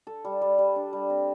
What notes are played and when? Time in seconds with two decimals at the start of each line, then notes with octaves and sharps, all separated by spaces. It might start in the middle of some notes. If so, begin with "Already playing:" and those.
0.07 A4
0.25 G3
0.42 G3
0.59 G3
0.76 D4
0.93 G3
1.10 C4